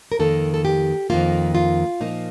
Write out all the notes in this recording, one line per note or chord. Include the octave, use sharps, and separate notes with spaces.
A#4
F2 D#3 A#3 A4
A4
G4
F2 D#3 A#3 F4
F4
A#2 F3 A#3 D#4